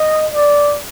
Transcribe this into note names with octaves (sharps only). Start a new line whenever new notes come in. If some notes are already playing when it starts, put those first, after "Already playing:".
Already playing: D#5
D5